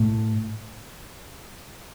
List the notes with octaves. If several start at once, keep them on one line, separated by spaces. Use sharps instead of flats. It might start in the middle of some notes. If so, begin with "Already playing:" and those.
Already playing: A2